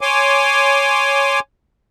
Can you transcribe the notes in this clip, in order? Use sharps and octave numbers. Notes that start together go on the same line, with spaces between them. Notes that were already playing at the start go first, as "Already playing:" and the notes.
C#5 G#5 C6 D6